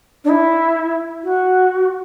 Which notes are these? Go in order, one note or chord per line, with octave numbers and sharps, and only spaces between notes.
D4
E4
F#4